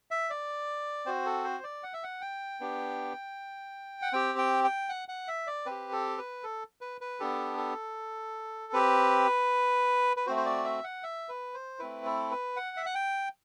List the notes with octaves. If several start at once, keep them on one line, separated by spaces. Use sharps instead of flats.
E5
D5
C4 F#4 C5
A4
C5
D5
F#5
E5
F#5
G5
B3 D4 G4
F#5
C4 G4 G5
G5
G5
F#5
F#5
E5
D5
C4 G4 B4
A4
B4
A4
B4
B4
B3 D4 G4 A4
A4
C4 G4 B4
B4
A3 C4 F#4 C5
C5
D5
E5
F#5
E5
B4
C5
A3 C4 E4 B4
A4
B4
F#5
E5
F#5
G5